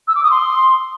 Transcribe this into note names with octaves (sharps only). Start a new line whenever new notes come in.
E6
D6
D#6
C6